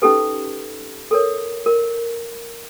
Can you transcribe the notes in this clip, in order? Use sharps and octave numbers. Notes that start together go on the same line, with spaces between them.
C#4 D#4 G4 A4 B4
A4 A#4 C#5
A#4